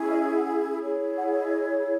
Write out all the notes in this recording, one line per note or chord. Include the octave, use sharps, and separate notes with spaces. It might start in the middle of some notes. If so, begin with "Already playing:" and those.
Already playing: C#4 E4 G#4
D#5
E5
F#5
G#5
E4 G#4 C#5
F#5
D#5